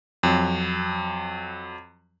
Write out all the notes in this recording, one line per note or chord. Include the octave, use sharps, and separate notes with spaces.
F2 F#3